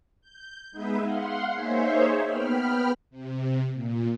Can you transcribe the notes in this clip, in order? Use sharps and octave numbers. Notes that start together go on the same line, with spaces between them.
G6
G#3 B3 D#4 G#4 B4 E5
F5 F#5 C6
A#3 D#4 G#4 C5 C#5 E5
B3 G5 B5 F6
C3
A#2